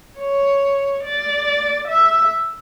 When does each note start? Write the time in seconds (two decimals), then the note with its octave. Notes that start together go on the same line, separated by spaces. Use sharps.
0.19 C#5
1.04 D5
1.88 E5